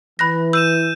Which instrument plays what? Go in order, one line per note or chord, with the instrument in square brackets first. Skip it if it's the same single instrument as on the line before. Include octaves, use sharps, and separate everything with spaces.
[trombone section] E3 [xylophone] B5 F#6 A#6
[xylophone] E6 [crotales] G6 D#7 E7